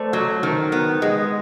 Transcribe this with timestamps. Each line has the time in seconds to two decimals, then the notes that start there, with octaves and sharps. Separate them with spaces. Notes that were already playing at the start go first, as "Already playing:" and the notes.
Already playing: A3 C5 D5
0.13 F#3
0.43 D#3
0.72 B3
1.02 G#3